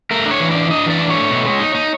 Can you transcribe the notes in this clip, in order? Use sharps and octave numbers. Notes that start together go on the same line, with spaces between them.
A3 A#4
D4
C#5
E3
D4 D5
D4 D#5
E3 D5
D4
C#5
A3
B2
G#3
D#4
D#4